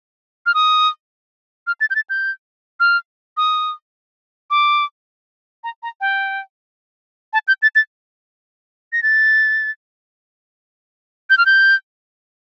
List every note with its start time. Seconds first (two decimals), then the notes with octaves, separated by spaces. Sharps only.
0.46 F6
0.54 D#6
1.67 F6
1.81 A6
1.90 G6
1.95 A6
2.10 G6
2.80 F6
3.37 D#6
4.50 D6
5.64 A#5
5.83 A#5
6.01 G5
7.33 A5
7.48 G6
7.62 A6
7.75 A6
8.93 A#6
9.03 A6
11.30 G6
11.38 F6
11.46 G6